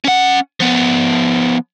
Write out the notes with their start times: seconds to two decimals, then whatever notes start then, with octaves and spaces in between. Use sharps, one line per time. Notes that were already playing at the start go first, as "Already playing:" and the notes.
0.04 C#4 F#5
0.60 F3 B3